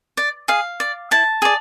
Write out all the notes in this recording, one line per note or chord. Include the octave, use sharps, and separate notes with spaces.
D5
G#4 F5
D5
E4 A5
G#4 D5